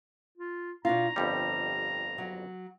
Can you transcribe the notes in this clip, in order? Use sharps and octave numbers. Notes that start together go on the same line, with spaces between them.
F4
B2 D4 F4 A#5
G1 F2 G3 G4
F#3